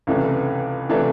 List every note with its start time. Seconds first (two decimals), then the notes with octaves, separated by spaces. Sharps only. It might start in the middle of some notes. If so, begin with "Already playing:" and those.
0.07 C#2 C3 E3 A3 D4
0.89 C3 E3 A3 D4